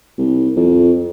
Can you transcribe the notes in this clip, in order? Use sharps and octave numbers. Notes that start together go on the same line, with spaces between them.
C2
F2